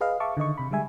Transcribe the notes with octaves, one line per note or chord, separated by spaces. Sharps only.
G#4 B4 D#5 F5
E5 F5 A5 C#6 D6
D3 D#3 D#5 C#6
C3 B5
D3 G3 G#3 E5 G#5